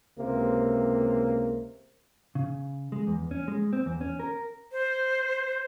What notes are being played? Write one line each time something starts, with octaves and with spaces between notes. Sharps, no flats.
C#2 C3 A#3
C#3
G#3
E2
C#4
G#3
C4
E2
C#4
A#4
C5